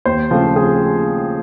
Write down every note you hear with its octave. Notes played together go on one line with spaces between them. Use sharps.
D#2 C5
C#3 F3 A3 C4
G#4